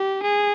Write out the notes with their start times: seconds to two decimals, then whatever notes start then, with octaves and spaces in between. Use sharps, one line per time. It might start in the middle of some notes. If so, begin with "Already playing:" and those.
Already playing: G4
0.23 G#4